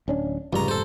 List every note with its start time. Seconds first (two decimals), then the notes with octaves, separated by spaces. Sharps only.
0.08 D1 C#4 D4
0.53 F1 C#2 G#2 G3 A#5
0.68 A4 C5